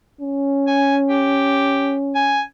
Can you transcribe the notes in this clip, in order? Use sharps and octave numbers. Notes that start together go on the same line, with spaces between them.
C#4
G#5
G4
G#5